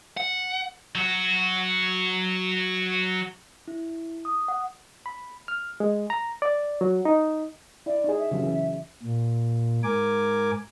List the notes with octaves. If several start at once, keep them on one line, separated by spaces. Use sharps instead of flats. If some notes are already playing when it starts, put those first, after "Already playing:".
F#5
F#3 F#4
E4
D#6
F#5
B5
F6
G#3
A#5
D5
F#3
D#4
E4 D5
D#4 G#4
E5
C#3 F#3 C#4
E3
A#2
G#2 A#4 G#5 D6